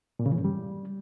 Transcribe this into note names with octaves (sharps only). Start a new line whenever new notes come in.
A#2
C#3
E3
G2
G3